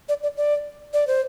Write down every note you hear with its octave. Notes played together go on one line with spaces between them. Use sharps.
D5
D5
D5
D5
C5